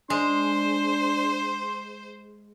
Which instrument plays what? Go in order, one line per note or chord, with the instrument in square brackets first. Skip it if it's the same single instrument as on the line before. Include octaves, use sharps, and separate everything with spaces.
[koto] G#3 [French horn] D4 [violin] C5 [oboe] C6